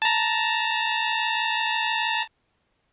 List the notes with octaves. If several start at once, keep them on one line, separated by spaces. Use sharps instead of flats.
A5 A#5